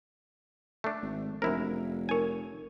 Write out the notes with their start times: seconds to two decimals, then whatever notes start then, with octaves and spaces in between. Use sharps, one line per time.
0.84 A3 D4
1.02 G#1
1.42 F1 F#2 D4 E4 A#4 C5
2.09 D#4 A#4 C#5 G#5